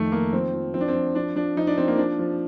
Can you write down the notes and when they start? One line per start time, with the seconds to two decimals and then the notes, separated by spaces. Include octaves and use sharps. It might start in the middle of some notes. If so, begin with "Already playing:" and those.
Already playing: F2 D#3 A3
0.12 D#3 A#3
0.33 F3 C4
0.53 F3
0.74 F3 C4
0.81 D4
0.88 C4
0.95 F3
1.15 F3 D4
1.36 F3 D4
1.57 F3 D#4
1.67 D4
1.78 F3 C4
1.88 A#3
1.98 F3 D4
2.19 F3